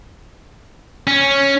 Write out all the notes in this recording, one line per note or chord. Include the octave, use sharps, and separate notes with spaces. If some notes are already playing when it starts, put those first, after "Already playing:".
C#4